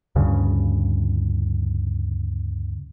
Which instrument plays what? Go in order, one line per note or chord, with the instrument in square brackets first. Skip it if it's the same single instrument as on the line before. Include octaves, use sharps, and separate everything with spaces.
[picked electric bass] D2 G2 C#3